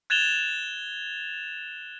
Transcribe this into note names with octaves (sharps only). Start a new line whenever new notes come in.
F#6 G#6 A6 E7 F7 G7